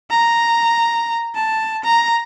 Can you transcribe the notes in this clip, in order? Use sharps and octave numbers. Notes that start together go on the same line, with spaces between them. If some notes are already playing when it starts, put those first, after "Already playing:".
A#5
A5
A#5